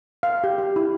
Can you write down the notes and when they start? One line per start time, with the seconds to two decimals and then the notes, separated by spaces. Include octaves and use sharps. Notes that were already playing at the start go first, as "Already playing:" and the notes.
0.23 F5
0.44 G4
0.59 G4
0.76 E4